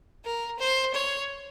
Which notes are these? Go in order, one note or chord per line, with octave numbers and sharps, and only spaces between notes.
A#4
C5
C#5